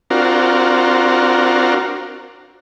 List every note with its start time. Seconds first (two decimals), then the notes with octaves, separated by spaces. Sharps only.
0.10 C4 D4 F4 F#4 A#4